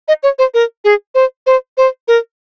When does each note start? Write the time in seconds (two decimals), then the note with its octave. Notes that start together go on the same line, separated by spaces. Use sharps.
0.08 D#5
0.23 C#5
0.39 C5
0.54 A#4
0.85 G#4
1.15 C5
1.47 C5
1.77 C5
2.08 A#4